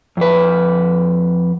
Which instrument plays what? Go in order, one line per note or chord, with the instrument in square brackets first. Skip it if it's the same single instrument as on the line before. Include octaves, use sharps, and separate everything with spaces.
[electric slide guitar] F2 B4